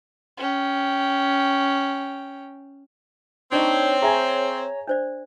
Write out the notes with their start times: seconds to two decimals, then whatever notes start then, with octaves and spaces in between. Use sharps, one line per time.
0.37 C#4 G5
3.52 C4 D4 D#4 C#5
4.02 G#4 E5 G#5 A#5
4.87 D4 C5 D5